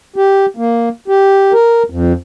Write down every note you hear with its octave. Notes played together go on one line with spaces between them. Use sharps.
G4
A#3
G4
A#4
F2